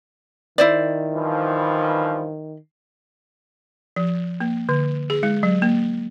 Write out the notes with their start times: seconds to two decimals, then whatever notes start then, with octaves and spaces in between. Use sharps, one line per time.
0.58 D#3 E4 C5 D5
1.14 G2 E3 F3
3.96 F3
4.40 A#3
4.69 D3
5.10 G#4
5.23 G#3
5.43 F#3
5.62 A#3